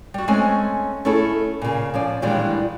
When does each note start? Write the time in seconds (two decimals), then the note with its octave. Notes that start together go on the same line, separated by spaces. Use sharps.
0.14 G3 F#4
0.28 G#3 A3 C4 C#4 G#5
1.05 A3 C#4 D#4 E4 G#4 A4
1.62 A#2 C#3
1.94 F3 C#4 D5
2.22 A#2 D#3 E3 G3 G#3 D4